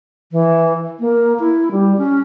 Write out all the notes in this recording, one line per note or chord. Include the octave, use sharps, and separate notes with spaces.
E3
A#3
E4
G3
C#4